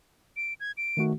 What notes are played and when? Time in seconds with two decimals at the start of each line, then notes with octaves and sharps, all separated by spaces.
0.37 D7
0.60 G#6
0.77 D7
0.97 D#3 A3 F#4